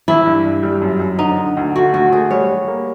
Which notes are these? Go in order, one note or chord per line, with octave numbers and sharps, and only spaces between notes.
E3 E4
G2
G2
G3
F#2
F#2
D3 D#4
D3
D2
A3 F#4
D2 F#4
A3 G#4
G3 C#5
G3
A#3